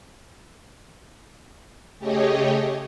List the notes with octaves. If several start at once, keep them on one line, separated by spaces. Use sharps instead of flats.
C#3 A3 G4 G#4 C#5 D#5